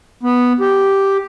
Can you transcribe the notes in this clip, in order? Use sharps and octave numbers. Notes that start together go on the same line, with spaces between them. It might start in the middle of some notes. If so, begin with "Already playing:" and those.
B3
G4